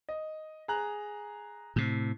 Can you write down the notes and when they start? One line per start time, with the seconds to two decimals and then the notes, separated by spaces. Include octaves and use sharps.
0.09 D#5
0.68 G#4 A#5 F#6
1.76 A2 C3